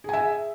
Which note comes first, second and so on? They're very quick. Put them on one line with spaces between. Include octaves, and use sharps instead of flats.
G#4 G#5 E5